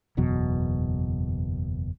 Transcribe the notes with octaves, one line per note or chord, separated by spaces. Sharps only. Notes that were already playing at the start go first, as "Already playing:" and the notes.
F#1 E2 B2 F#3